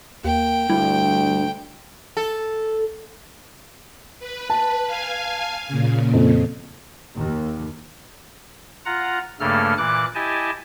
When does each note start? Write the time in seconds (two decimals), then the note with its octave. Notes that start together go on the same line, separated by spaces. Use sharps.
0.25 D#2 A#3 G5
0.70 D2 G2 E4
2.17 A4
4.19 B4
4.50 A5
4.86 F5 G#5
5.68 A#2 C#3
6.13 F2
7.16 D#2
8.85 F4 F#5 A#5
9.40 G2 C#3 A3 A#3 A4 F6
9.78 A#2 E3 D6 F#6
10.15 E4 G4 D#5 G#5 A5